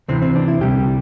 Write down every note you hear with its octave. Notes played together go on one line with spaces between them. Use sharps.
D2 C3 E3 C4
C4
D4
E4
C2 C3 G3 G4